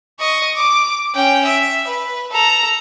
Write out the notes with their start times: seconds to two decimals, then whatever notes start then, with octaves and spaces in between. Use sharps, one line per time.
0.20 D#5 C#6
0.55 D6
1.15 C#4 G5
1.45 E5
1.88 B4
2.31 A4 A#5